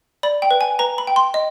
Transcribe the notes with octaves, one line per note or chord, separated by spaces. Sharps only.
D5 B5
G5
B4
G#5
B4 A#5
B5
G5
C6
D#5